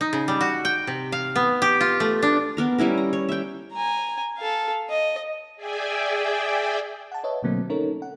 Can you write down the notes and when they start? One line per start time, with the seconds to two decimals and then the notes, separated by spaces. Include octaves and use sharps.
0.01 D#4
0.13 C#3
0.28 G3
0.41 F#4
0.65 G5
0.87 C3
1.12 F5
1.36 B3
1.62 G4
1.81 F4
2.00 A3
2.22 D4
2.57 B3 A#4 A#5
2.78 G3 C#4 E4 A#4
2.98 A#5
3.13 C#5
3.29 E5 G5
3.72 G#5 A#5
4.38 A4 F5
4.90 D#5
5.56 G#4 D5 E5 G5 G#5
7.12 F#5 A5
7.24 B4 C#5 D#5 E5
7.43 B2 D3 F#3 A3 A#3 C4
7.69 C#4 D#4 A4 A#4 C#5
8.02 F#5